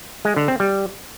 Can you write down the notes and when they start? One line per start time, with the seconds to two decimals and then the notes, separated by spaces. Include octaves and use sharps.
0.25 G#3
0.37 D3
0.48 C4
0.60 G3